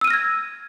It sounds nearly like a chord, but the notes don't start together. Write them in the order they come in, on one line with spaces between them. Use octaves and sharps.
E6 D#7 F6 A#6 G#6